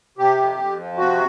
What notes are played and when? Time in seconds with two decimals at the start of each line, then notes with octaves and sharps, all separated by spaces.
0.18 C3 G4
0.38 F2
0.58 F2
0.78 F3
0.97 C3 F#4